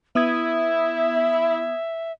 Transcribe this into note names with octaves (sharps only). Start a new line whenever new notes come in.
B3 E4 E5 D#6 G#6